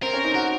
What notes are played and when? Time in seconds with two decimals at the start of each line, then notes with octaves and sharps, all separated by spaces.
0.02 C4 A#4
0.14 C#4
0.24 D#4
0.34 F#4 A#4